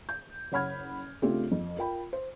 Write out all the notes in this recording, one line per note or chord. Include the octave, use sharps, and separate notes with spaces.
G6
F#1 C#5 F#5 B5 F6 G#6
C#3 A3 C4 D4 F4 G4
F2
F4 A#4 G5 B5
C5